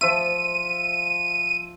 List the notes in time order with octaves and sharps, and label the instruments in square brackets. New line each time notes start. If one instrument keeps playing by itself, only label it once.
[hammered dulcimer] F3 E5 [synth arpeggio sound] D#7